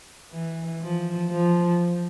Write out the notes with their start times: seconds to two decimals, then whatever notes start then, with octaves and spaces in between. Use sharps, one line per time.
0.32 E3
0.82 F3
1.31 F3